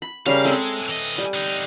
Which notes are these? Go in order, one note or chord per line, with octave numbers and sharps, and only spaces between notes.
B5
C#3 G3 A#4 F5
G#3 C4 A4 E5
E3 D#5
G3
D3 D#4